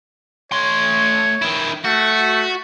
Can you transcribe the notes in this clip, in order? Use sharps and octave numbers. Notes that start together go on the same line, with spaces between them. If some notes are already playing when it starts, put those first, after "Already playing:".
A3 C#5 C6
D#3 E4
A3 F#4